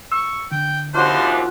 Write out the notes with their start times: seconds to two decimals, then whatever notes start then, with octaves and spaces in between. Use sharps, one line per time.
0.12 C#6 E6
0.52 D3 G5
0.94 D#2 C3 F3 D4 F4 F#4 C5